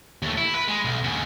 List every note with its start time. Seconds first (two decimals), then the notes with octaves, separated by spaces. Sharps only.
0.22 D#2 A3
0.38 E4
0.55 B4
0.68 G#3
0.85 B1
1.04 D#2 C#3